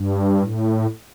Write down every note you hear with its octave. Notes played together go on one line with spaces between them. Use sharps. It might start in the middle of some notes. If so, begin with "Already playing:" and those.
Already playing: G2
A2